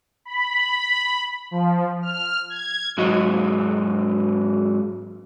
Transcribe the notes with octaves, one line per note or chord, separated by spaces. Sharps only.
B5
F3
F6
G#6
G#2 F#3 F#4 D#5